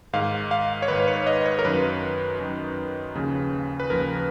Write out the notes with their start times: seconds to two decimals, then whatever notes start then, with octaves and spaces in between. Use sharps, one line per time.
0.13 G#2 D#3 F5
0.51 F5
0.82 C#5
0.88 G#2 D#3 B4
1.08 C#5
1.27 D#5
1.45 C#5
1.59 A#4
1.65 F#2 D#3 B4
2.40 F#2 D#3
3.15 D#2 C#3 F3
3.80 B4
3.90 D#2 C#3 F3 A#4